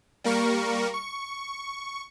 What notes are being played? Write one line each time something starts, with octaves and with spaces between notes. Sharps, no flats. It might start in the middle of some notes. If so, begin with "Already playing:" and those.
G3 A#3 A#4 C#6
C#6